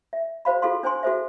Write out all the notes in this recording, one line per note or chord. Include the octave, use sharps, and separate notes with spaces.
E5
F#4 C5 F5 B5
F4 F#4 A4 F5 C6
D4 C5 G5 G#5 C6
F#4 A4 C5 E5